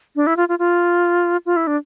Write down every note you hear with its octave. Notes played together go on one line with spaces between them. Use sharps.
D4
E4
F4
F4
F4
F4
E4
D4